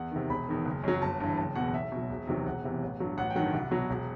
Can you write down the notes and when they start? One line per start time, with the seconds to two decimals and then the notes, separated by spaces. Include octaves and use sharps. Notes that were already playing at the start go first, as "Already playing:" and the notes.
Already playing: E2 F#5
0.11 C3 D#3
0.29 E1 B5
0.49 E2 D#3
0.65 F#1
0.84 F#2 F#3
1.01 G1 A5
1.20 G2 E3
1.37 F#1 A5
1.55 E2 B2 F#5
1.74 B1 E5
1.92 B2 F#3
2.09 E1
2.27 E2 C3 D#3 F#3
2.46 E1 F#5
2.64 E2 C3 E3
2.82 A1
3.00 G2 F#3
3.18 A1 F#5
3.30 G5
3.36 G2 D#3 F#3 F#5
3.54 C2
3.71 B2 F#3
3.90 E1